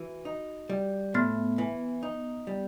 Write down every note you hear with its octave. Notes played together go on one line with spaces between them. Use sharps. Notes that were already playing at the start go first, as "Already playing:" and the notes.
Already playing: E3 F#4
D#4
G3
A2 B3
E3
D#4
G3